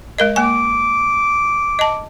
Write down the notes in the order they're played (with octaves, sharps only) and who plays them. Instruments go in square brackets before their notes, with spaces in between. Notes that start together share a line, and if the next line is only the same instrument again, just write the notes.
[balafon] G#3 A#4 D#5
[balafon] A#3 G#5 [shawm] D6
[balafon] D#5 A5